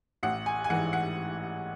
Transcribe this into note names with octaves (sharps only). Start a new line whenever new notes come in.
A1 F#5
G#5
G#5
G#2 E3 F#5
F#5